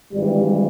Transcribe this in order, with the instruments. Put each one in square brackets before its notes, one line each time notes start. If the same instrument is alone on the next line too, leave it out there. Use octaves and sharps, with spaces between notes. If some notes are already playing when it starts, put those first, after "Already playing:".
[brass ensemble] G#1 G2 E3 G3